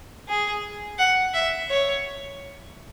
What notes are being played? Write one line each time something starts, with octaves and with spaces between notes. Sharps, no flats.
G#4
F#5
E5
C#5